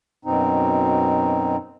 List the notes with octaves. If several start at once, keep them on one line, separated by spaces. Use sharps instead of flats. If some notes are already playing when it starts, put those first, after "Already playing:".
F#2 B2 C4 D#4